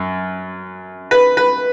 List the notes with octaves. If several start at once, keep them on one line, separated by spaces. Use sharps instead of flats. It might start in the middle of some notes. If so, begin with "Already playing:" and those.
Already playing: F#2
B4
B4